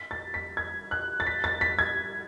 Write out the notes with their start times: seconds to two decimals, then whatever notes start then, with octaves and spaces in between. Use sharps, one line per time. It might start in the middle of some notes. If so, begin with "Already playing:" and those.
Already playing: B6
0.11 A6
0.34 B6
0.57 G#6
0.91 F#6
1.20 A6
1.27 B6
1.44 A6
1.61 B6
1.79 G#6